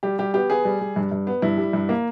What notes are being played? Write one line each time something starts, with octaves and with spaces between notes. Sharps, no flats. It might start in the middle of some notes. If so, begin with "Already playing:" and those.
G3 G4
G3 G4
B3 G4
B3 G#4
G3
G3
G2
G2
B3
G2 E4
G3
G2
A#3